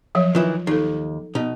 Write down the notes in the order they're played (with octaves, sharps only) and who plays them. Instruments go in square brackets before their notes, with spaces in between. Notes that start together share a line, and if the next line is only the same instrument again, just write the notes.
[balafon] F3 F#3 C#5
[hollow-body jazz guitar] D#3 E3 E4 [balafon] F4
[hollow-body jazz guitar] D#2 [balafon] D#4 A4
[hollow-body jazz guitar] B2 D#4